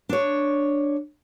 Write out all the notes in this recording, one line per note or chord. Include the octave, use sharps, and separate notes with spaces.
D4 C#5